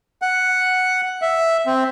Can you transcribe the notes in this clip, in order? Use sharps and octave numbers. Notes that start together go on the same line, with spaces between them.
F#5
E5
C4